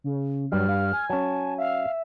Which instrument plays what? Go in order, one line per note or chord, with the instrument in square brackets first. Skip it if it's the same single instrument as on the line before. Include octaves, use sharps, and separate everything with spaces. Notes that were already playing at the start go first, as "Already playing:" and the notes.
[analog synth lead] C#3
[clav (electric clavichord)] G2 G3 [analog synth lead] F#3 [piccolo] F6
[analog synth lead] F5
G#5
[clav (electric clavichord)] F#3 C#4 [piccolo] A5
[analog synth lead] E5 [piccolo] F5